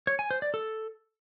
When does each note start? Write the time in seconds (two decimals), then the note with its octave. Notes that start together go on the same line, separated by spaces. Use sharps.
0.07 C#5
0.19 G#5
0.31 C5
0.42 D5
0.54 A4